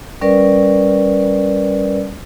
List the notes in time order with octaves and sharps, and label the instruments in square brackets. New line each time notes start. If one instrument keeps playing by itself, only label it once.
[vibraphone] G3 C#4 A#4 B4 D5